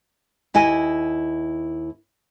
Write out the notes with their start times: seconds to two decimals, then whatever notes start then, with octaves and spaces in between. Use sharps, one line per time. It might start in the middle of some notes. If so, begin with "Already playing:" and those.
0.54 D#2 E4 D#5 G#5